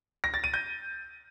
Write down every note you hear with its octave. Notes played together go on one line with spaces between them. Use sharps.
A#6
A6
D#7
G6